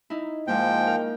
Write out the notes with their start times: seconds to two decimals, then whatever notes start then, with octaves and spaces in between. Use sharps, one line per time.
0.10 D#4 E4
0.47 G#2 F3 G#3 A#3 G5
0.87 A#4